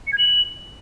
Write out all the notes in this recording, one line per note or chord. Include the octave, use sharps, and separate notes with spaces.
C#7
G#6
F#7